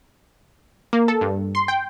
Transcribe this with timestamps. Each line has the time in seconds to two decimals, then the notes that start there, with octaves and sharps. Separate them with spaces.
0.93 A#3
1.08 A4
1.21 G2
1.55 C6
1.68 G5